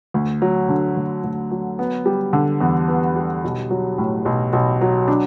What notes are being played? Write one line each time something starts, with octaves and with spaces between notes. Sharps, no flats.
D2
F#3
D3
D2
D2
F#3
B3
G3
D3
E2
B3
G3
B1
F#3
A2
B1
B1
F#3
D4